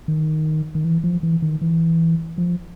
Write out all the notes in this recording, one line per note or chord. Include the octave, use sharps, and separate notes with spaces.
D#3
D#3
E3
F3
E3
D#3
E3
F3